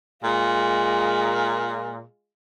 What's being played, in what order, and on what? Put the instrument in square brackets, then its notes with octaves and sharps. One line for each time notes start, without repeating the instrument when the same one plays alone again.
[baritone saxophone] A#2 [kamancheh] G#3 F4